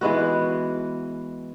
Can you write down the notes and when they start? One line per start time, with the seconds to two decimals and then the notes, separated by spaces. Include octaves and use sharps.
0.01 E3 G#3 B3 F#4